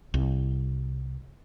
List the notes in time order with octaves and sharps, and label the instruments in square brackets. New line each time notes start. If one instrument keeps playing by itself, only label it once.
[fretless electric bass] C2